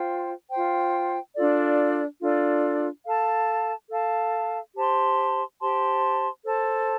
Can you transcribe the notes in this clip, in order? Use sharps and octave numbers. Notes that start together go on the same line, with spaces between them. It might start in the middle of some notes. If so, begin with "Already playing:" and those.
Already playing: F4 C5 G5
F4 C5 G5
D4 F4 A4 D5
D4 F4 A4 D5
A4 F5 A5
A4 F5 A5
G4 C5 A5 C6
G4 C5 A5 C6
A4 C5 A5